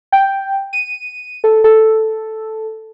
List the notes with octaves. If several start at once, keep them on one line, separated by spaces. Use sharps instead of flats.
G5
D#7
A4
A4